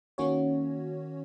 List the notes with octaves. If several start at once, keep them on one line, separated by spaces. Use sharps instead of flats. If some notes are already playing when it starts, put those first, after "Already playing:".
D#3 A#3 C#4 F#4 C#5